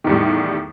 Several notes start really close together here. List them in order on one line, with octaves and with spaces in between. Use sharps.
D#3 E2 G3 A2